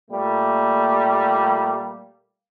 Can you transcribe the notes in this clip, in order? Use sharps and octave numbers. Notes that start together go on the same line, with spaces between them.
A#2 G3 A3 A#3